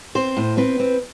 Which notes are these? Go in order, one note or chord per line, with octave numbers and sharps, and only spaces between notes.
C4 C5
A2
C4 B4
C4